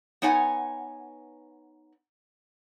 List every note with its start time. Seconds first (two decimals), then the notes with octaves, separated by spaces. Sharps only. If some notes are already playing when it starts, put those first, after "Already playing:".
0.22 B3 D#4 C#5 F#5 G#5